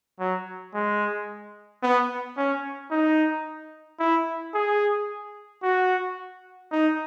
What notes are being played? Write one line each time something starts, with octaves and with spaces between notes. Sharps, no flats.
F#3
G#3
B3
C#4
D#4
E4
G#4
F#4
D#4